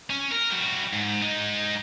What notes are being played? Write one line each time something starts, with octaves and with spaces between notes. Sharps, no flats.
C#4
A#4
G3 F#4
G#2
G#3 D#4